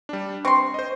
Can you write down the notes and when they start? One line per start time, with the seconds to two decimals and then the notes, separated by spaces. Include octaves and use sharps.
0.09 G3 D4
0.45 C4 C6 C#6
0.74 C5 D#5